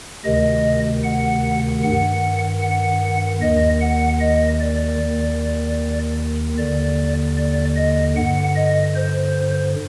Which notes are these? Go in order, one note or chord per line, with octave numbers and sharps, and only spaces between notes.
D2 C3 D#3 D#5
F#5
G2 D#3 F#5
F#5
D#2 D#3 D#5
F#5
D#5
D5
D#2 D#3
D#2 D3 D5
D5
D#5
G2 D3 F#5
D#5
C5